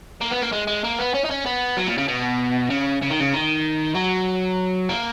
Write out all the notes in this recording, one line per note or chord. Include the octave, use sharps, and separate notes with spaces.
A#3
B3
A#3
G#3
G#3
A#3
B3
C#4
D#4
C#4
B3
F#3
A#2
C#3
B2
C#3
C#3
D#3
C#3
D#3
F#3
A#3